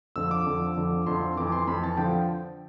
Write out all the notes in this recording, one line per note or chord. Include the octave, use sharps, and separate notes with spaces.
F2 D3 F3 E6
D6
F2 D3 F3
F2 D3 F3
F2 D3 F3 C6
F2 E3 D6
C6
F2 E3 B5
A5
D3 F3 G5